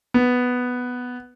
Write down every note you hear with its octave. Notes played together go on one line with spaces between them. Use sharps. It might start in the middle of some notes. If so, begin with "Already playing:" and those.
B3